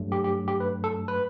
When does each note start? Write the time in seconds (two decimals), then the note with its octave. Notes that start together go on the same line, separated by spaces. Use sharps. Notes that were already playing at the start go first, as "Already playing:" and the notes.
Already playing: G2 F#3 A3
0.12 G4
0.24 G4
0.48 G4
0.60 B4
0.84 A4
1.08 B4